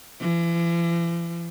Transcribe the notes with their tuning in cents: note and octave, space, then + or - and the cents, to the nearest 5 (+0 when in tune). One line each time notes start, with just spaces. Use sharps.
E3 +45